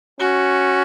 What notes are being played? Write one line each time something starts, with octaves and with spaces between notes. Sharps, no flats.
C#4 F#4